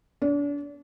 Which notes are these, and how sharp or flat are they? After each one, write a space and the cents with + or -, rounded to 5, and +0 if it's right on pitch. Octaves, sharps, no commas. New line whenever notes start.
D4 -35